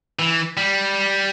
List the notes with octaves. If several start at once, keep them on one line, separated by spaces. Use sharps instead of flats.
E3
G3